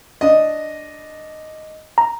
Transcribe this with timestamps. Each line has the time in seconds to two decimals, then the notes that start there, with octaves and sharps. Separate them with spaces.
0.21 D4 D#5
1.98 A#5